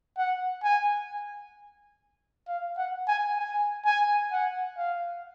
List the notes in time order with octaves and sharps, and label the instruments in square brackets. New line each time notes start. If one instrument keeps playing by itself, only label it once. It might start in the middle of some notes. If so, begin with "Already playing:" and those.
[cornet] F#5
G#5
F5
F#5
G#5
G#5
G#5
F#5
F5